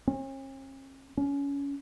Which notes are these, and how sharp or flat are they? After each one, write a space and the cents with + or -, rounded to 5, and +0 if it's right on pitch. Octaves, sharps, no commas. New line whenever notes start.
C#4 -45
C#4 +25